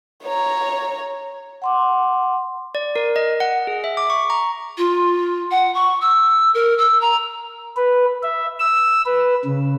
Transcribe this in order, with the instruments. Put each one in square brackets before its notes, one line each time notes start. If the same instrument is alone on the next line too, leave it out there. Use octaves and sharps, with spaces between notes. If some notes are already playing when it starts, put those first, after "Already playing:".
[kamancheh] C#5 A#5
[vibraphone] F#5 C6 D6
[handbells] D5
A#4
D#5
F#5
G#4
E5
D6
C#6
A#5
[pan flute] F4
F#5
C#6
E6
A#4
E6
A#5
[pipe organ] B4
E5
E6
B4
C#3